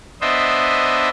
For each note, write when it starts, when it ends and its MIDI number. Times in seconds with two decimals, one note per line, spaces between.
0.21 1.09 59
0.21 1.09 62
0.21 1.09 72
0.21 1.09 75
0.21 1.09 76